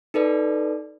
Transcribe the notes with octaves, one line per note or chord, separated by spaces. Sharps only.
D#4 A4 B4 D5